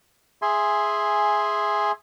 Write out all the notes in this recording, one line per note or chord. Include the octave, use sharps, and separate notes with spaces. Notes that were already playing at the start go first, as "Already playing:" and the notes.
G#4 E5 G#5 C6